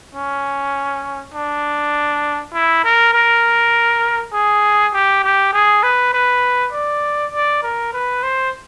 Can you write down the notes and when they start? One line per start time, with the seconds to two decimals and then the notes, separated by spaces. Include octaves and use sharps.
0.15 C#4
1.34 D4
2.53 E4
2.84 A#4
3.13 A#4
4.33 G#4
4.93 G4
5.24 G4
5.53 G#4
5.83 B4
6.13 B4
6.72 D5
7.32 D5
7.63 A#4
7.93 B4
8.23 C5